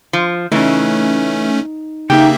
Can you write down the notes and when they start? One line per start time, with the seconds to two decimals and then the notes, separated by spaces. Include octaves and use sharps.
0.13 F3
0.52 C#3 E3 A3 C#4 D#4
2.10 C#3 A#3 D#4 G4 E5 G5